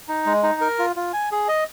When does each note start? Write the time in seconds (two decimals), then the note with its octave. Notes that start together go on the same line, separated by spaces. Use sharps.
0.08 D#4
0.26 G#3
0.43 D#4
0.61 A#4
0.79 F4
0.96 F4
1.13 G#5
1.32 G#4
1.48 D#5